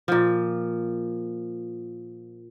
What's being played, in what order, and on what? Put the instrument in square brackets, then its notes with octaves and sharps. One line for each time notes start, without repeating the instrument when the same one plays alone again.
[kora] A#2 F3